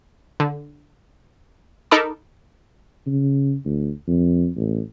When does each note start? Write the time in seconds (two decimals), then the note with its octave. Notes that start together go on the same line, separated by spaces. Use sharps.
0.40 D3
1.91 D#4 A4 A#4 A5 B5 D6
3.07 C#3
3.65 D2
4.07 F2
4.56 A1